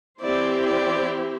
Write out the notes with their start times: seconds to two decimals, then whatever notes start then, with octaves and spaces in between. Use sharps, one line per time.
0.21 E3 C4 E4 G4 C5 D5
0.65 D5